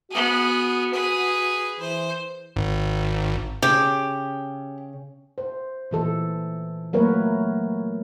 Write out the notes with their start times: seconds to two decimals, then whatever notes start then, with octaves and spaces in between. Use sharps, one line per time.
0.11 B3 F#4 G#4
0.93 G#4 B4
1.80 E3 C5
2.56 G#1
3.62 C#3 G4
5.38 C5
5.91 A#2 E3 A4
6.93 F#3 A3 A#3 A#4 B4 C#5